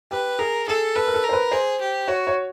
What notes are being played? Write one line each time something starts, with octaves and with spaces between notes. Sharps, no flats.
G4 B4
G#4 A#4
G#4 A4
A4 B4
A#4
A4
A#4
C5
B4
G#4 C5
G4
F#4 C#5
C#5